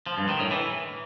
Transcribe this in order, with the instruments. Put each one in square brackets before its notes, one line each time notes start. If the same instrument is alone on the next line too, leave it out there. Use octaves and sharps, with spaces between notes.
[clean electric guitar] F3
G2
D#3
A2
E3